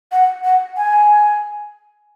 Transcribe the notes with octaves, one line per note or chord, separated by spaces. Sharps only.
F#5
F#5
G#5